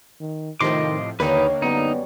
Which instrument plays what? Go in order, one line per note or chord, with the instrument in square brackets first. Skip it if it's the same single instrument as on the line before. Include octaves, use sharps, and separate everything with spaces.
[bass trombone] D#3
[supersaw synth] A2 C3 F3 [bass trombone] D#3 [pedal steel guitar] D#5 C6 D6
[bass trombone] D#2 [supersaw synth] D3 A#3 [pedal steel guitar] D#4 B4 [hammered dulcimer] C#5 D#5 G5
[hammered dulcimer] F#2 G3 [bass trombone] B3 [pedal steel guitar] D#4